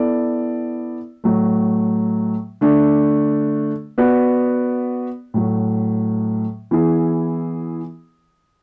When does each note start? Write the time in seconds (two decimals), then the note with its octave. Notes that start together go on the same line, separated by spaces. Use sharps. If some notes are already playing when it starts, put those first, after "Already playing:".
Already playing: B3 E4 A4 D5
1.24 A2 F#3 A3
2.61 D3 A3 D4
3.98 B3 F#4 B4 D5
5.34 A2 F#3 A3
6.71 E3 B3 E4 G#4